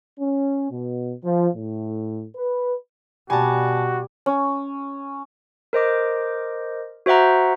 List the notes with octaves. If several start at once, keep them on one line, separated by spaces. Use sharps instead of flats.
C#4
B2
F3
A2
B4
B2 G3 F#4 G#5 A5
C#4
A#4 C5 D#5 D6
F#4 C5 E5 F#5 A#5